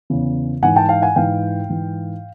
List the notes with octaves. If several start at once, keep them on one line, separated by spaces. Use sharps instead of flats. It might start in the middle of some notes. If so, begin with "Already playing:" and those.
E2 C#3 E3
G#2 E3 F#5 G#5
G5 A5
F5 G5
F#5 G#5
G#2 E3 F5 G5
G#2 E3